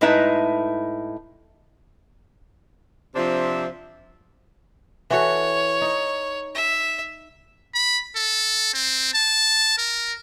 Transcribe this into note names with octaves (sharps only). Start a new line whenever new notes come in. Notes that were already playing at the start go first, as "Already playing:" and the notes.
A2 G#3 D#4 E4 B4 A5
C3 F3 C4 D4 E5
E3 F#4 A4 C#5
D#4
E5
B5
A4
C4
A5
A#4